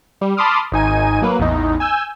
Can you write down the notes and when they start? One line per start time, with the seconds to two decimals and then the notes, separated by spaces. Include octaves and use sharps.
0.21 G3
0.37 A5 B5 C6 D6 D#6 F6
0.72 G#1 D#4 G#5 D#7
1.22 F#3 A#3 B4
1.39 A1 E2 D#4
1.80 G#5 E6 G6